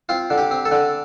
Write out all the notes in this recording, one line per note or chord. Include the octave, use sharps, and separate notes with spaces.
C4 F4
D3
G4
C4
A4
D3